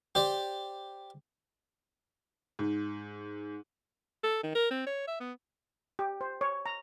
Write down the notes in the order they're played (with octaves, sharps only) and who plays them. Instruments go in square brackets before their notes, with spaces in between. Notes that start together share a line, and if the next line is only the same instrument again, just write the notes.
[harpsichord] G4 C5 D5
[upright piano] G#2
[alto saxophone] A4
D#3
A#4
C4
C#5
E5
B3
[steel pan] G4
C5
C#5
A#5